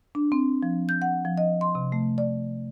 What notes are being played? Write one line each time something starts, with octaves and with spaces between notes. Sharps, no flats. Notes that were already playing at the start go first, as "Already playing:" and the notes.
D4
C4
F3
G6
F#5
F3
D#5
C6
C3
A3
D5